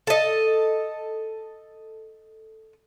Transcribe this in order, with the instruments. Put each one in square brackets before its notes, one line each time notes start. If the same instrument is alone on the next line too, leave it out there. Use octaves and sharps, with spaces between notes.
[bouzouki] A4 D#5